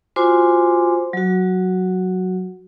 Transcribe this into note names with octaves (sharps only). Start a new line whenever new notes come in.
F4 F#4 C5 G#5 C6 D6
F#3 F#4